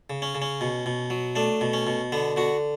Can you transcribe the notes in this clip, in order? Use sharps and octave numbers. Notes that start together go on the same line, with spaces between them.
C#3
C#4
C#3
C#4
B2
B2
F#3
A3 D4
B2
C#4
B2
D3 B3
D3 F#4